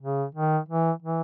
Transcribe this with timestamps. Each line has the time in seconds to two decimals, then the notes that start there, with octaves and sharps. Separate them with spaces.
0.02 C#3
0.35 D#3
0.68 E3
1.02 E3